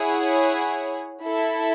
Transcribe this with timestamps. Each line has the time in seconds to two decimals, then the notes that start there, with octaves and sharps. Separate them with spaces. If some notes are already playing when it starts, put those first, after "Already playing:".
Already playing: E4 G#4 C#5 F#5
1.22 E4 A4 E5